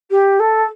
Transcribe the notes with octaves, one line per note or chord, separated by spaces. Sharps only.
G4
A4